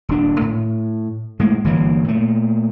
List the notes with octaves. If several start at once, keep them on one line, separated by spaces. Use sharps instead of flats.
D#1 D4
A2
A2 G#3 A#3
G1 E3 F#3 A#3
A#2 A3